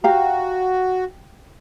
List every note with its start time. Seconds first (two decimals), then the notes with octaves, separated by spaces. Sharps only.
0.04 F#4 G4 F5 A#5